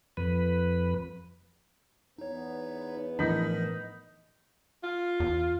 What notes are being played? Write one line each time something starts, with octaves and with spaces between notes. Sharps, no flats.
F2 B4
E2 B3 D#4 C#5
A2 E3 F3 D4 D#4 A#4 B5
F4
E2